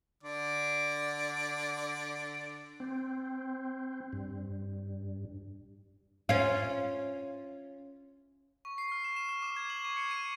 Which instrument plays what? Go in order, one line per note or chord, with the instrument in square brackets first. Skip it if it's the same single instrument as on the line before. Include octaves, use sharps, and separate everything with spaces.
[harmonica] D3 D5
[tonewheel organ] C4
G2
[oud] C#4 F4
[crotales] C#6
C7
F6
E7
E7
F6
D6
G#6
F#7
C#6
C#7
D#7